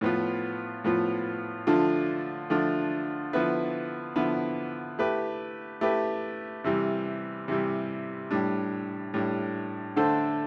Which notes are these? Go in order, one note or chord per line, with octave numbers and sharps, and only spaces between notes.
A2 F3 B3 F4
A2 F3 B3 F4
D3 F3 A3 D4 F4
D3 F3 A3 D4 F4
D3 F3 B3 E4 B4
D3 F3 B3 E4 B4
A3 E4 G4 B4
A3 E4 G4 B4
C3 E3 G3
C3 E3 G3
A2 G3 D4
A2 G3 D4
D3 A3 D4 A4 C5